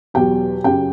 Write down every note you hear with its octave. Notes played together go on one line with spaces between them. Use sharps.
E2 B2 F#3 G4 G5
F#2 C#3 F#3 G4 G5